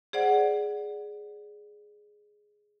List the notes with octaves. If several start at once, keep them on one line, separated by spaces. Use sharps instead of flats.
G#4 C5 D5 F#5